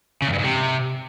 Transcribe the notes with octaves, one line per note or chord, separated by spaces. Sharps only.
C#3
E2
G2
G#2
C3